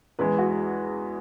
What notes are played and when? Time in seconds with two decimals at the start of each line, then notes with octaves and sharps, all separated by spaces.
0.19 E2 E3 G#3 B4
0.38 F#4